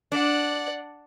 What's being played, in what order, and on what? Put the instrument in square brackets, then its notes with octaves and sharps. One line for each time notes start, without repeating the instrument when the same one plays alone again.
[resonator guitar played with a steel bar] D4 [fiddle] D5 F#5